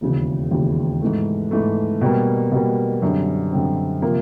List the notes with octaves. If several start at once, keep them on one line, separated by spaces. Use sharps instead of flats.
E1 D#2 C#3 E3
E1 D#2 C#3 E3
G#2 E3 A3
G#2 E3 A3
B2 G3 A#3
B2 G3 A#3
F#2 D3 G3 C4
F#2 D3 G3 C4
C3 F3 A#3